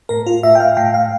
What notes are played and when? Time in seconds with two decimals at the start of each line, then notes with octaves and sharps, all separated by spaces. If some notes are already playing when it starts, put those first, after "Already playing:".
0.09 A2 A#4
0.27 F4
0.43 A2 E5
0.55 G5
0.60 F5
0.77 A2 G5
0.94 F5